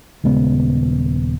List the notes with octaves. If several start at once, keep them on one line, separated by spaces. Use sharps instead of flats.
D#1 C#3 G#3 B3